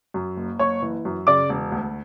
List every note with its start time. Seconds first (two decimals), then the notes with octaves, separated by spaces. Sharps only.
0.14 F#2
0.37 F#1
0.59 F#1 C#5 C#6
0.82 E3
1.05 F#2
1.27 C#3 D5 D6
1.49 E1
1.72 D2